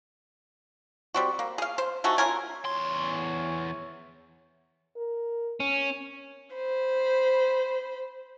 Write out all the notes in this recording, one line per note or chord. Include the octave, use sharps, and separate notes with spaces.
G3 C4 F#4
A#3
G#4 F5
C5
A3 D#4 F#4 G#5
C#4 F4 A#4 G#5
E2 C#5 C6
A#4
C#4
C5 B5